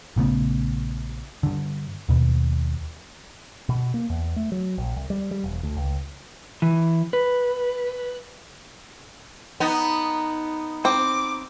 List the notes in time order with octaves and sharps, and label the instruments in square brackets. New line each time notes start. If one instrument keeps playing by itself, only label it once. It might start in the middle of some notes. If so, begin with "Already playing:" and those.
[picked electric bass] A#1 C#3 A3 B3
G2 D3
D#2 B2
B2
A#3
E2
A3
F#3
A#1
C2
G3
G3
E1
D2
C#2
[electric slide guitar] E3
B4
[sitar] B3 D#4
[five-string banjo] C4 [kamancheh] D6